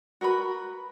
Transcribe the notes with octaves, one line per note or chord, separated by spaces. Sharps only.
F#4 A#4 B4 B5